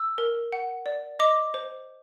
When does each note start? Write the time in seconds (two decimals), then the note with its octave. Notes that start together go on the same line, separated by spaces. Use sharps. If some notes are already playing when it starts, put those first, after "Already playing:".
Already playing: E6
0.18 A#4
0.52 F#5
0.86 D5
1.19 D#5 D6
1.54 C5